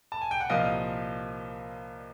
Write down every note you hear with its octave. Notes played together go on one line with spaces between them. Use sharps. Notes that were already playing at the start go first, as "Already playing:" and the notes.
A5
G#5
G5
F#5
C2 A#2 F3 D#5 F5